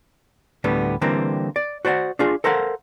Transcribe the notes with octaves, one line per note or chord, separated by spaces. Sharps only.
D2 A2 D3 G3 B3
D3 E3 G3 A#3 C4
D5
F#4 C5 D5 F5 F#5
D4 F4 G#4
A4 A#4 C5 F5 F#5